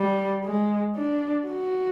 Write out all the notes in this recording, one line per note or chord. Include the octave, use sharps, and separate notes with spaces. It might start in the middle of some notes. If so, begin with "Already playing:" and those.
Already playing: G3
G#3
D4
F#4